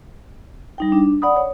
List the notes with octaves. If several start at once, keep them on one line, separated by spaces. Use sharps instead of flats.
G3 D#4 G5
D4
D5 F#5 B5 D#6
C#5